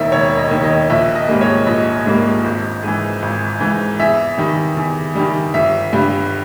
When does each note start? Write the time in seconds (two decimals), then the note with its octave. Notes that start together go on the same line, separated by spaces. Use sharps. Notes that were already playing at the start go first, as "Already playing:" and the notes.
Already playing: E1 D#2 D#3 E5
0.12 E1 C#5
0.38 D#5
0.51 D#2 D#3
0.63 D#5
0.90 A#1 E5
1.15 D#5
1.29 G#2 G3 A#3
1.41 C#5
1.67 A#1 D#5
2.06 G#2 G3 A#3
2.44 G#1
2.83 G#2 E3
3.22 G#1
3.61 G#2 E3
4.00 E2 E5
4.38 D#3 G3
4.77 E2
5.15 D#3 G3
5.54 G1 E5
5.93 G2 G3